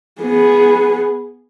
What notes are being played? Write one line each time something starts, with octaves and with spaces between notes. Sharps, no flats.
B3 G#4